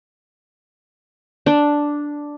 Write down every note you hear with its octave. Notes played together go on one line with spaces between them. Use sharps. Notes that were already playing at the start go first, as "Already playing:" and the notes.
D4